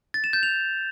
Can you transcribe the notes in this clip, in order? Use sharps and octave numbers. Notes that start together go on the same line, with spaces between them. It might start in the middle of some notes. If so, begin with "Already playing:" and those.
A6
E7
G6
F7